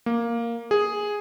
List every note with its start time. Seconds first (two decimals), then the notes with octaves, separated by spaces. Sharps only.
0.06 A#3
0.71 G#4